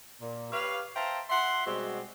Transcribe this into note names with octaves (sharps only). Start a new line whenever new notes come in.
A#2
G4 B4 C#5 F5
C5 E5 F5 G5 A5 A#5
F4 E5 F#5 C6
B2 G3 G#3 C4 F#4 G4